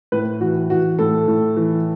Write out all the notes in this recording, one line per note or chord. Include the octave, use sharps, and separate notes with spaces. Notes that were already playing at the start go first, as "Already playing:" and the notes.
A2 B4
E3 F#4
E3 F#4
A2 A4
A2
E3